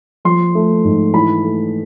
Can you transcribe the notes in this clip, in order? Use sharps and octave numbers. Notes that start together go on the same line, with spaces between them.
F3 C6
A3
G#2
E3 B5
A3